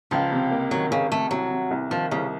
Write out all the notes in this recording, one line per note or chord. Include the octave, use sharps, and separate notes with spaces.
C#2 F3
C3
A#3
D#3 F#3
C#2 C#3
C3 A3
C2 F#3
C3
C2
D#3 F3
C2 C#3